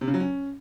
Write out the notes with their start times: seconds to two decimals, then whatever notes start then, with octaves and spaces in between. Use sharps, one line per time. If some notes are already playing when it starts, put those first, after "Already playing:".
0.01 C3
0.08 C#3
0.14 F#3
0.20 C#4